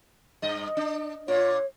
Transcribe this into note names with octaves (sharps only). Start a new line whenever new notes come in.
G2 D#5
D4
A#2 F4 C#5